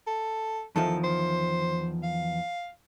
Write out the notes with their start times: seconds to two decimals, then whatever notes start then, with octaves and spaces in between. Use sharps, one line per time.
0.07 A4
0.76 E2 D#3 F3 A4
1.04 C5
2.03 F5